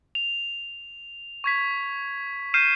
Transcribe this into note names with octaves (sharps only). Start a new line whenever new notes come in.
F7
C#6 G#6 B6
F6 G6 C7 D#7 E7